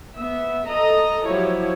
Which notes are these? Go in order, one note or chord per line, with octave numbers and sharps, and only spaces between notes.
B3 E5
A4 D#5 A#5
F3 F#3 E4 G4 C#5